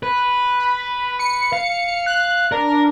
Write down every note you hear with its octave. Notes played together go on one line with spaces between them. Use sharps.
B4
B5
C#7
F5
F#6
D4 A#4